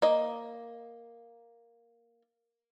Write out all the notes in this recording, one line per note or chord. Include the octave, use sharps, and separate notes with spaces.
A#3 D#5